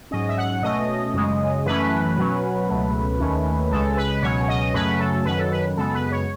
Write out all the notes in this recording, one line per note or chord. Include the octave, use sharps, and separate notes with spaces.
G#2 F#3 C#4 D#5
E5
F#5
B2 A3 C#4 D#5
F#2 C#3 G#3
F#2 E3 A3 C#4 B4
B2 F#3 C#4
C#2 B2 F#3 A3
D#2 D#3 A3 C#4
C#2 C#3 G#3 A4
B4
C#2 B2 F#3 C#4 C#5
D#5
F#2 C#3 F#3 A3 C#4 B4
A4
F#2 D#3 F#3 C#4 B4
A4
B4
F#2 C#3 G#3 B3 A4
B4
C#5